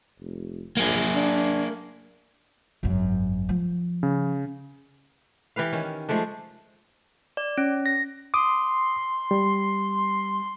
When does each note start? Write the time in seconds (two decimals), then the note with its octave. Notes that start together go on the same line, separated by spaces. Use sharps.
0.20 F1
0.77 A#1 A#3 G#4
1.15 D4
2.83 G#1 F#2
3.49 F3
4.03 C#3
5.56 E3 G4 B4 F5
5.73 D#3 C#4
6.09 F3 G#3 A3 D4
7.37 D5
7.58 C#4
7.86 A#6
8.34 C6 D6 D#6
9.31 G3